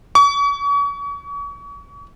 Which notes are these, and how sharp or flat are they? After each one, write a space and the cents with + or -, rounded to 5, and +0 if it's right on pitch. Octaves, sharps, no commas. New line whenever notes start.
C#6 +40